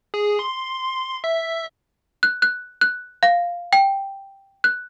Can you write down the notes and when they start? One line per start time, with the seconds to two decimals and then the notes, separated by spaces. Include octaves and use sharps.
0.14 G#4
0.39 C6
1.24 E5
2.23 F#6
2.42 F#6
2.81 F#6
3.23 F5
3.73 G5
4.64 F#6